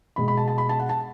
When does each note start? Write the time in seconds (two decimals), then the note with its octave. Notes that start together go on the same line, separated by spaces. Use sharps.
0.16 B2 G#3 B3 B5
0.28 B5
0.37 A5
0.48 A5
0.58 B5
0.69 A5
0.79 F#5
0.89 A5